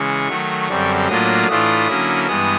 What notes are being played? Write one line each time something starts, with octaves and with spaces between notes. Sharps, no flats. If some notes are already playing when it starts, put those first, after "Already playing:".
Already playing: C#3 E3 G#3 C#6
D#3 F#3 A3
F#2 D3 G3 C4
A2 F#3 A#3 D4 F4 D#6
A2 E3 A3 D4 F4 D#6
D3 F#3 A#3 C#4 E4
G2 E3 G#3 B3 D#6